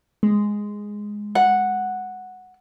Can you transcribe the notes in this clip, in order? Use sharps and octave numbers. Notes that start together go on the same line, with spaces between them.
G#3
F#5